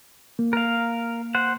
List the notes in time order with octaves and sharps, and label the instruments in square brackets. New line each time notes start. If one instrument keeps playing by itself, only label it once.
[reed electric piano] A#3
[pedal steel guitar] A#4 F5
C5 F#5